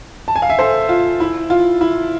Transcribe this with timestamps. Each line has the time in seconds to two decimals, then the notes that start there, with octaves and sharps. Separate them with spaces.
0.28 A5
0.36 G#5
0.42 F5
0.49 E5 G#5
0.59 A4 C5
0.89 F4
1.20 E4
1.50 F4
1.81 E4